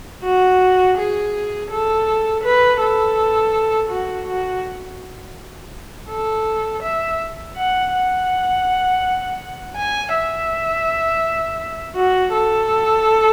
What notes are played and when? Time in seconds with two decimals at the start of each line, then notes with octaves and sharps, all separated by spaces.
0.24 F#4
0.97 G#4
1.70 A4
2.43 B4
2.81 A4
3.90 F#4
4.27 F#4
6.10 A4
6.83 E5
7.56 F#5
7.93 F#5
9.76 G#5
10.14 E5
11.96 F#4
12.33 A4